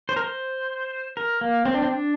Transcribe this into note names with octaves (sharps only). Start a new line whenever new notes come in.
C5
A#4
C5
A#4
A#3
C4
D4
C4
D4